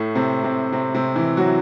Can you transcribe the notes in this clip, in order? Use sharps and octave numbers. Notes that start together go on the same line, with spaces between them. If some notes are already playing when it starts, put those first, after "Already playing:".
Already playing: A2 A3
C3 C4
C3 C4
C3 C4
C3 C4
E3 E4
F#3 F#4